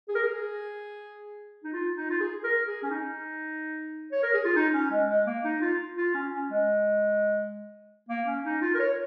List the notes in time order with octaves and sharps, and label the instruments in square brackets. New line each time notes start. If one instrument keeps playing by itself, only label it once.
[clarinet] G#4
A#4
G#4
D#4
F4
D#4
F4
G#4
A#4
G#4
C#4
D#4
C#5
A#4
G#4
F4
D#4
C#4
G#3
G#3
A#3
D#4
F4
F4
C#4
C#4
G#3
A#3
C#4
D#4
F4
A#4
C#5